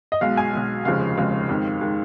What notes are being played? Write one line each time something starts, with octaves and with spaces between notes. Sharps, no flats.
D#5
B1 B2 G#3 F5
G#5
B1 B2 G#3
F1 D#2 C#3 F3 G#3 F5
F1 D#2 C#3 F3 G#3 F5
F2 D#3 G#3
D#3 G#3